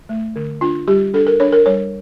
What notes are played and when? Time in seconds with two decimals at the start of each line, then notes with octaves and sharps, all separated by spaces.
0.09 A3
0.36 D3
0.61 D4 F4
0.87 G3 G4
1.14 D4 A4
1.27 A#4
1.40 D4 C#5
1.52 A#4
1.66 G3 C#5